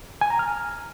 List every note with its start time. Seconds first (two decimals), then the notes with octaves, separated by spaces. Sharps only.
0.21 G#5
0.30 A#5
0.39 F6